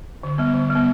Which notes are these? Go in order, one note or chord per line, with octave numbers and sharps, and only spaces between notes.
D3
G3 B3
D3
G3 B3